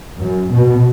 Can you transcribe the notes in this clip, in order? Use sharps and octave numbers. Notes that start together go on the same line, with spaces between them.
F#2
B2